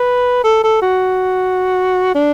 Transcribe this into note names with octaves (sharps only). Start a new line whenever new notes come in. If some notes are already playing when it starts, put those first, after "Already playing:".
Already playing: B4
A4
A4
F#4
D4